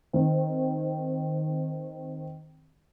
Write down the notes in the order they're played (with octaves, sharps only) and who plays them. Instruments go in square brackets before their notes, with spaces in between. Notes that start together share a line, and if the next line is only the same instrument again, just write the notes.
[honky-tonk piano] D#3 C4